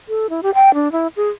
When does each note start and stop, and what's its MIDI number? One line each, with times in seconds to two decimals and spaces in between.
0.08 0.29 69
0.30 0.40 64
0.43 0.50 67
0.54 0.73 79
0.74 0.91 62
0.92 1.07 64
1.16 1.29 68